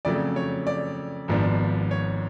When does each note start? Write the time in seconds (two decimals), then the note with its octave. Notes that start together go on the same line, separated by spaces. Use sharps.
0.05 F2 C#3 F#3 A3 D5
0.36 C#5
0.67 D5
1.28 G#1 G#2 F3 B3 D4
1.91 C#5